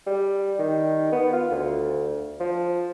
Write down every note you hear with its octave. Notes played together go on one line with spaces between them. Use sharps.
G3
D#3
B3
F4
D2
F3